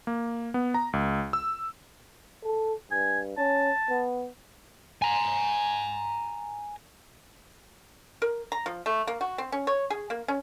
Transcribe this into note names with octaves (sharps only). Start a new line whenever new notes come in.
A#3
B3
A#5
C#2
E6
A4
G2 G#5
C#4 A5
B3
G#5 A#5
A#4
A#5
F3
A3
A#3
F#4
C4
C#4
C#5
G#4
A#3
C#4